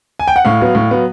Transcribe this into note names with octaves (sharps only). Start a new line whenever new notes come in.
G#5
G5
F#5
A2 F5
F#3 B3
A2
F#3 B3